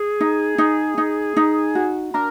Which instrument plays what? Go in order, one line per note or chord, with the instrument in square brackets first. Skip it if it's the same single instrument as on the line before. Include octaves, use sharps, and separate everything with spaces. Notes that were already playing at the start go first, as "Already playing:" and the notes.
Already playing: [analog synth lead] G#4
[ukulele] D#4
D#4
D#4
D#4
F#4
[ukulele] D4 [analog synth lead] A#4